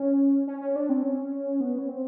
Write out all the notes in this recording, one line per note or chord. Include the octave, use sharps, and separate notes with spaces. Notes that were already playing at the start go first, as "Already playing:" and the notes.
Already playing: C#4
C#4
C#4
D4
C4
C#4
B3
C#4
C4